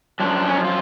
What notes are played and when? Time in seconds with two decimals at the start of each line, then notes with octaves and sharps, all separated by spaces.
0.20 F#2 F3 D4
0.47 C#4
0.55 D4
0.64 F4